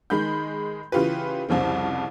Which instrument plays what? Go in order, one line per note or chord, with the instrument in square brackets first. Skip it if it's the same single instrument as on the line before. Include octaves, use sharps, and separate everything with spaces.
[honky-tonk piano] D#3 G#3 B5 G6
C#3 E3 F4 G4 B4
C2 F2 C#3 C4